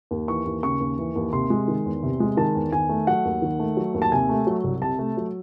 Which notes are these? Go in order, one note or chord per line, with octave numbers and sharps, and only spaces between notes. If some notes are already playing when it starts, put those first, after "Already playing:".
D#2
E3 C#6
D#2
C#3 C#6
D#2
E3
D#2
C3 C6
G#3
D#3
E2
C3
G#3
D#3 A5
E2
D#3 G#5
A3
F#3 F#5
D#2
D#3
A3
F#3
D#2
A5
C3 G#5
A3
F#3
C2
C3 A5
A3
F#3